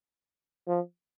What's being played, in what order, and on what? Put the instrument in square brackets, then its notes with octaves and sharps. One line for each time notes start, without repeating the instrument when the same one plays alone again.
[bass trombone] F3